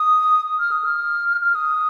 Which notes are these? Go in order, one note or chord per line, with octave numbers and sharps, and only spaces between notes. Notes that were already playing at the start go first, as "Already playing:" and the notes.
Already playing: D#6
F6
D#6
F6
F6
D#6